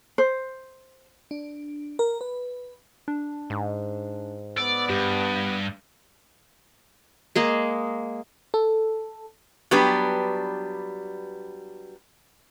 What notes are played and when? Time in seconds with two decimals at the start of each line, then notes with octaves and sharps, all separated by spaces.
0.18 C5
1.31 D4
1.99 A#4
2.21 B4
3.08 D4
3.50 G#2
4.58 B3 D5 E6
4.90 G2 G4
7.36 G#3 A#3 G#4 D#5
8.54 A4
9.71 F#3 G3 B3 D4 G4 B4